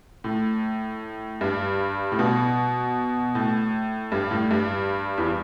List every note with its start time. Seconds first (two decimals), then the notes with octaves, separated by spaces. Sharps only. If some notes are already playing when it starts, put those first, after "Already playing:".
0.24 A2
1.41 G2
2.12 A2
2.19 B2
3.35 A2
4.12 G2
4.31 A2
4.51 G2
5.18 E2